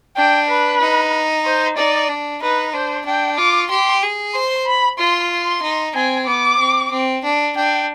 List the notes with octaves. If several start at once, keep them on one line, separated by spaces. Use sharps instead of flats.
D4 G5
B4
D#4
C5
D#4 D5
D4
D#4 B4
D4 C5
D4 G5
F4 D6
G4 C6
G#4
C5 C6
B5
F4 C6
C6
D#4
C4 G#5
B3 D6
C4
C4
D4
D4 G5